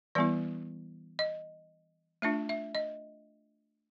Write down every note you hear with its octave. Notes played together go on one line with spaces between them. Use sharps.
E3 G3 B3 E4 D5
D#5
A3 D4 F4 E5
E5
D#5